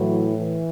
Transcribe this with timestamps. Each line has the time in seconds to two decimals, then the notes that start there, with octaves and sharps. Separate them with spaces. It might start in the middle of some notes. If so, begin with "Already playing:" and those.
Already playing: A2 E3 F#3
0.36 E3